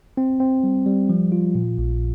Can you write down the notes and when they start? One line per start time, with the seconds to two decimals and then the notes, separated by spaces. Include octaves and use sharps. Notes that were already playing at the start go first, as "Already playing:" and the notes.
0.17 C4
0.40 C4
0.64 G3
0.86 G3
1.09 F3
1.32 F4
1.55 A#2
1.78 A#1